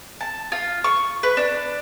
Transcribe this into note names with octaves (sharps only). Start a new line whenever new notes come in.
A5
F4
C#6
B4
D4